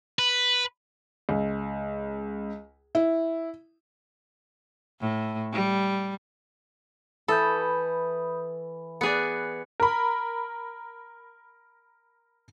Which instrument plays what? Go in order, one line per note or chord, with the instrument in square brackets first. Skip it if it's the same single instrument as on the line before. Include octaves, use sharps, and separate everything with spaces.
[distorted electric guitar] B4
[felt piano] C#2
E4
[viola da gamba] A2
G3
[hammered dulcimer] E3 C#6 [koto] A4 [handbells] B5 D#6 G6
[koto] B3 G#4 D5 [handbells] F#6 C#7
[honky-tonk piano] A#4 B5